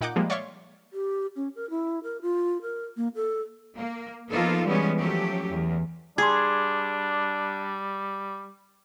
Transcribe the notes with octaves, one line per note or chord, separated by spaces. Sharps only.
A#2 D#4 F#5 D6 F#6 G6
F3 G3 G#3 A#3
C#5 D5 E5 F5 C6 C#6
G4
C#4
A#4
E4
A#4
F4
A#4
A#3
A4
A#3
F3 A#3 B3 D#4 F4 A4
E3 G3 G#3 B3 C#4
F3 F#3 A3 C#4 G4
E2
G3 D4 G#4 C6 G#6